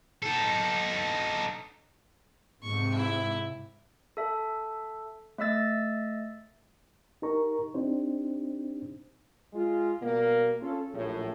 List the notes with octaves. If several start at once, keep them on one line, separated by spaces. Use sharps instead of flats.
D#4 A4
G#2 C3 C#6
E4 E5
A4 E5
A3 D#5 E5 E6 A6
D#4 G4 A#4 A#5 C#6
C4 D4 D#4 G4 C5
G#3 F4
B2 G3 A#3
C#4 F4 A4
A#1 F#2 A2